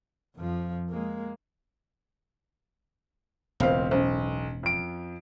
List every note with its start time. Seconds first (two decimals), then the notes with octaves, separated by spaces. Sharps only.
0.37 F2 F3
0.90 G#3 A#3
3.60 E1 C#2 A2 C4 A#4 C5 F5
3.91 B1 C#4 C5
4.63 F2 D7